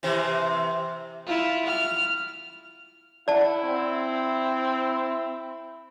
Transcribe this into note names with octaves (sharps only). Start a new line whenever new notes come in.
C3 E3 C5
E4 F4
F6
E4 D5 F#5 A5
C4